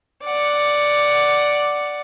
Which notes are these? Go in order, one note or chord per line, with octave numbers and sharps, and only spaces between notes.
D5 F#5